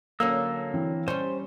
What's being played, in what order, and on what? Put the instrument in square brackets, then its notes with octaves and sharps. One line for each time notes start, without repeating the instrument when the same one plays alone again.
[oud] D3 F#3 C#4 [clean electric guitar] A#3 [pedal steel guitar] E6
[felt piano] E3 C4
[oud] G3 C#4 [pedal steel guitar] C5 [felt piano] C6